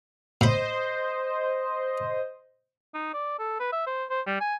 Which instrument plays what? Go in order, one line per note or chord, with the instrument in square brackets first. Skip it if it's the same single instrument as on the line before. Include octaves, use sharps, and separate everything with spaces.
[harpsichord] A2 B5 [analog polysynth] C5 D#5
[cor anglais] D#4
D5
A4
B4
E5
C5
C5
G3
G#5